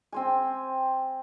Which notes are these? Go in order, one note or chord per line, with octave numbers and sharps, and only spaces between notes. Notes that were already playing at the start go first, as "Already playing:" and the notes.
C4 C5 G#5